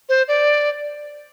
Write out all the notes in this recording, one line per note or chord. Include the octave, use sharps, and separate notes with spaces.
C5
D5